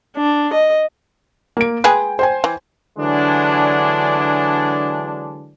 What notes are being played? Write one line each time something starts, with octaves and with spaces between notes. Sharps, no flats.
D4
D#5
A#3 D7
G#3 G#4 B4 G5
C5 G5 G#5
E3
D3 E3 F#3 G#3 D4